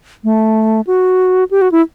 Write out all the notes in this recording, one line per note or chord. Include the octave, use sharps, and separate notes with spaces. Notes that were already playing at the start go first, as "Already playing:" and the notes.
A3
F#4
G4
F#4
E4